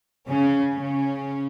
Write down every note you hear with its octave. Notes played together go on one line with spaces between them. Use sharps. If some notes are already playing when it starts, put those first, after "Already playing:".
C#3 C#4
C#3 C#4